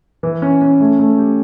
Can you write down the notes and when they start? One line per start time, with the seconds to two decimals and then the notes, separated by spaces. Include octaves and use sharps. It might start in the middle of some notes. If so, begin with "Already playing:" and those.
0.23 E3
0.42 C#4
0.62 C#4
0.80 A3
0.99 A3
1.18 G4